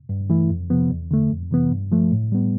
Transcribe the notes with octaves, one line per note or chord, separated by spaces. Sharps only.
G2
E3 A3 E4
F2
C3 F3 B3
E2
D3 A3
F2
C3 E3 B3
G2
F3 A3
A2
G3 B3